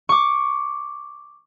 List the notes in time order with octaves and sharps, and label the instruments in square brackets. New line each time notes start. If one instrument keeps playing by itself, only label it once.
[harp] C#6 D6